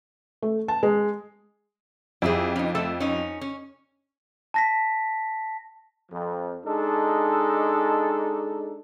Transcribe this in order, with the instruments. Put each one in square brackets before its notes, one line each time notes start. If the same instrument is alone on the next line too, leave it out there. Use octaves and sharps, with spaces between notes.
[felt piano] A3
A5
G#3
[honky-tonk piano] F2 [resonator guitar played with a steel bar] E4 G4 G#4
[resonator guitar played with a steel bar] C#4 D#4
A3 A4 A5
C#4 D#4
C#4
[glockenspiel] A5 A#6 B6
[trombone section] F2 F3
G#3 D4 D#4 A4